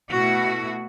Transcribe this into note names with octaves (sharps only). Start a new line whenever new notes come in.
B2 A3 E4 F#4